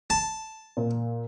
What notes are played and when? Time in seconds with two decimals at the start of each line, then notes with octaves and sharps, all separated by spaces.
0.10 A5
0.77 A#2